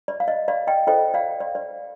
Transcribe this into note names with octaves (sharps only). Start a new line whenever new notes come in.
D5
F5
D#5
D5 F5
D#5 G5
F4 A4 C5 D#5 G5
D5 F5
D5
D5